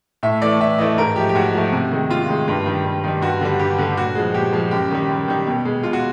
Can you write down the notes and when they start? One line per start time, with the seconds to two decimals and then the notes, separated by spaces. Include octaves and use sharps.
0.23 A2 E5
0.42 E3 A3 D5
0.60 A2 E5
0.78 E3 A3 D#5
0.98 G#2 A#4
1.16 F3 A3 G4
1.29 G4
1.35 G#2 F#4
1.54 F3 A3
1.73 C3
1.91 D#3 G#3
2.10 C3 F4
2.28 D#3 G#3
2.48 G2
2.66 D#3 G3
2.85 G2
3.04 D#3 G3
3.22 G2 F#4
3.41 D3 G3
3.60 G2 G4
3.78 D3 G3
3.97 A#2 F#4
4.15 F3 G#3
4.34 A#2 G4
4.53 F3 G#3
4.71 F#2 G4
4.91 D#3 G3
5.09 F#2
5.28 D#3 G3
5.46 B2
5.65 G#3
5.83 B2 F4
5.93 F#4